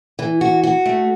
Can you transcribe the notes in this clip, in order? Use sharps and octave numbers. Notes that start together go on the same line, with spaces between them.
E3
F#4
F#4
A3